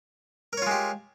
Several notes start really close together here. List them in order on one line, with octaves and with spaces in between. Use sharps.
A#4 C#5 F4 G#3 G4